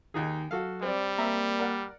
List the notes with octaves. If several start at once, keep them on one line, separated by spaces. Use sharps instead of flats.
D#2 D#3 D#4 G#4
F#3 F#4 A4 F5
G3 C4 D5
A#3 C4 E5 A#5
A#4 D5 F#5